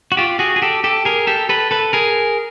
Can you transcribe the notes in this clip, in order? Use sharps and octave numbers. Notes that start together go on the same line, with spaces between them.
F#4
F4 G4
F#4 G#4
G#4
G4 A4
G4 A4
G#4 A#4
G4 A4
A4 B4
A4 B4
G#4 A#4